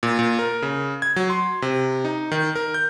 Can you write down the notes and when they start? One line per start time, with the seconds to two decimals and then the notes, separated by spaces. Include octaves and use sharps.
0.03 A#2
0.19 A#2
0.39 A#4
0.62 C#3
1.02 G#6
1.16 F#3
1.30 C6
1.62 C3
2.05 D#4
2.31 D#3
2.55 A#4
2.74 G6